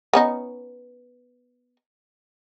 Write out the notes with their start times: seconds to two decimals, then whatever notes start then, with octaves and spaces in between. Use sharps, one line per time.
0.13 B3 C#4 D#4